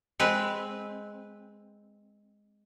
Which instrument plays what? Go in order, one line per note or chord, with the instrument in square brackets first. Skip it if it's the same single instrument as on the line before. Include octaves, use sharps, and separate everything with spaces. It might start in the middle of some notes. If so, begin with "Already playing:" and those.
[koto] G#3 C4 B4